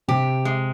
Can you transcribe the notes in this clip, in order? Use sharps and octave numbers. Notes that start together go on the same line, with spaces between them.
C3 G4
G#3